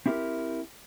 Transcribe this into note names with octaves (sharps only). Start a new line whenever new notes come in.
C4 E4 G4 A4 A#4